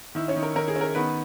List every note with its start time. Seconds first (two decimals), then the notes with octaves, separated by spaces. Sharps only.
0.15 D#3 E4 E5
0.28 C#4 C#5
0.36 D#3
0.43 A#4
0.55 D#3 A#4
0.68 G#4
0.76 C#4
0.81 A#4
0.95 D#3 B3 B4